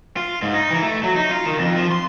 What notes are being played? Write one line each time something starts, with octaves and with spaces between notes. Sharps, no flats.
F4
G#2
D#4
E3
A3
F#3
D#4
F4
D#3
F2
F3
C6